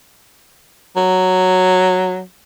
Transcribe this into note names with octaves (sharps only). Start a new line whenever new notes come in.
F#3